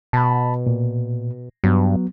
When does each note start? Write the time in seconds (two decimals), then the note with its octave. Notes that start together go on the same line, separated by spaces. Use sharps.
0.13 B2 A5 B5
0.67 A#2
1.64 G2 F#3 B3